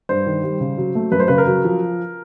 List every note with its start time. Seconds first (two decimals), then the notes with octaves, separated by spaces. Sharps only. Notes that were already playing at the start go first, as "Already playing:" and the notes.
0.09 G2 C5
0.27 D#3
0.43 G3
0.60 C#3
0.78 F#3
0.95 A3
1.12 F#2 B4
1.20 C5
1.28 C#3 B4
1.38 A#4
1.47 F#3
1.65 F3